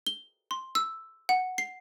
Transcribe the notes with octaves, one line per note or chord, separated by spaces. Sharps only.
G7
C6
E6
F#5
C7